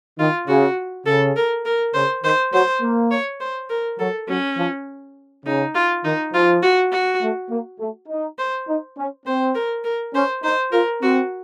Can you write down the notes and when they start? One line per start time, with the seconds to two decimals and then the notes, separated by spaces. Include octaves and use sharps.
0.19 D#3 F4
0.48 C#3 F#4
1.06 C#3 A4
1.36 A#4
1.65 A#4
1.94 C#3 C5
2.23 D#3 C5
2.53 F#3 C5
2.82 A#3
3.11 C#5
3.40 C5
3.69 A#4
3.99 F#3 A4
4.28 F#3 C#4
4.58 F3
5.45 C#3 D#4
5.75 F4
6.04 D#3 D#4
6.33 F3 F4
6.63 F#4
6.91 F#4
7.21 A3
7.50 A#3
7.80 A3
8.08 D#4
8.39 C5
8.68 D#4
8.97 C#4
9.26 C4 C5
9.55 A#4
9.84 A#4
10.14 C#4 C5
10.43 D#4 C5
10.72 F4 A#4
11.02 C4 F#4